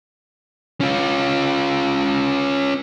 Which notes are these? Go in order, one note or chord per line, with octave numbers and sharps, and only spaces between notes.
C#4 F4